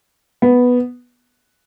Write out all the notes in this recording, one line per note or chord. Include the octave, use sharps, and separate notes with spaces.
B3